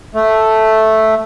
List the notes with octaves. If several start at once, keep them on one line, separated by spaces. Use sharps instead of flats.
A3